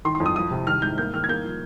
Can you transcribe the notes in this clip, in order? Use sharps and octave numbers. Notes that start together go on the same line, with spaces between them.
D#3 C6
C6
F2
D#6
F3 D#6
C3
D#3 F6
G#2 G6
A#3 G6
D#3 F6
G#6
A#3 G6
F3